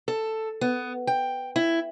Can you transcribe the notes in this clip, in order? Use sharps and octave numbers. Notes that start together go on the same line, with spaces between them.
A4
B3
G5
E4